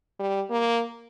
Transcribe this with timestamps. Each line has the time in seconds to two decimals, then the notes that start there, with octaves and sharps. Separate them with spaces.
0.20 G3
0.50 A#3